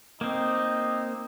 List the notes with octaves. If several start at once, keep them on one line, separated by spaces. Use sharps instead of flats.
A#3 C4 D#4